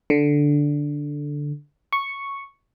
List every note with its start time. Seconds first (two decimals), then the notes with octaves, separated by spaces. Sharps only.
0.10 D3
1.93 C#6